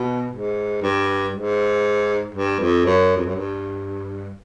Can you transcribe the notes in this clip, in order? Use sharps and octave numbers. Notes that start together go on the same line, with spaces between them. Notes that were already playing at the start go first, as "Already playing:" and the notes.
Already playing: B2
G#2
G2
G#2
G2
F2
F#2
F2
F#2
G2